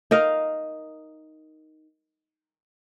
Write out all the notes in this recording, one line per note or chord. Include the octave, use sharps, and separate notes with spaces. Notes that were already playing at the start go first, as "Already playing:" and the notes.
D#4 A#4 D#5 F5